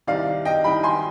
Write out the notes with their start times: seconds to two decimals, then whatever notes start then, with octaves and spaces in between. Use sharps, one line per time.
0.07 C2 C3 D#3 D5 F5
0.45 D#5 G5
0.64 C2 C3 D#3 G5 B5
0.83 G#5 C6